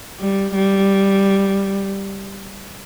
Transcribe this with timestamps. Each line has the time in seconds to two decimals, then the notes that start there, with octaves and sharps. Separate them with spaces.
0.20 G3
0.55 G3